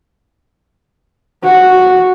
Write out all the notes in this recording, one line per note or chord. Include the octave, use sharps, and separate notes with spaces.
F#4